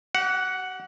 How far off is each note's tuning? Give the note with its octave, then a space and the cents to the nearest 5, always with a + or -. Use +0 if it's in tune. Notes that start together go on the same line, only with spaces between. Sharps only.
G4 -45 F#5 +0